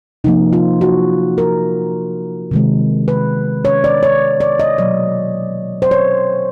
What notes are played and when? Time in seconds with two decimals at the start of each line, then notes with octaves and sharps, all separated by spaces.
0.24 C3 F3 A#3 D#4
0.53 F4
0.81 F#4
1.38 A#4
2.51 C3 D#3 G#3
3.08 B4
3.65 C#5
3.84 D5
4.03 C#5
4.40 D5
4.59 D#5
4.78 B2 F#3 A#3 D5
5.82 C5
5.91 C#5